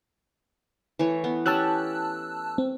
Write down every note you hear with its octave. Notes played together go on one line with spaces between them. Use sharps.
E3 A3 C#5
B3
C#4 G4 C#5 A5 E6 F#6
C4